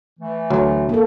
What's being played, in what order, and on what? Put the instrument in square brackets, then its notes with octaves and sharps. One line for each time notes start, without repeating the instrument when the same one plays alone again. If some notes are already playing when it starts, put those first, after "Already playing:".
[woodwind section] E3 A3
[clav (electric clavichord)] D2 F#3
[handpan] A#3 A4